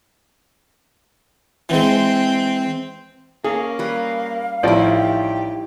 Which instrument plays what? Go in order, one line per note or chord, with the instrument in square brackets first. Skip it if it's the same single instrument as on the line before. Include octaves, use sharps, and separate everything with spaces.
[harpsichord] E3 G#3 [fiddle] C4
[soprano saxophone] A#3 [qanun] C#4 [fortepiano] G#4
[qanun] G3 B4 [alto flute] F5
[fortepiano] A1 F3 D5 [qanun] D#4 E4 [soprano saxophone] G4